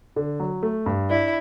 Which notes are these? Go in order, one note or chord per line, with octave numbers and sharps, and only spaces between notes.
D3
F#3
A3
G2
D4 E4